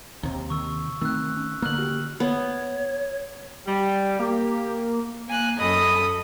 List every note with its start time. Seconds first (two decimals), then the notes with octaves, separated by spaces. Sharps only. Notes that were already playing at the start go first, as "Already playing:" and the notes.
0.23 D#2 C3 A#5
0.50 D#3 C#6 E6
1.02 D#3 A3 C4 E6 F#6
1.37 C#4
1.62 D3 A#3 F6 F#6 F#7
1.78 F#4 G4
2.20 B3 C#5
3.67 G3
4.19 A#3 G4
5.27 A#3 G#5 F#6
5.60 F#2 A4 D#5 B5 D#6